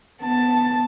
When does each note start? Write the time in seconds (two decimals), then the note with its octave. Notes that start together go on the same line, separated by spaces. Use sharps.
0.22 B3 A5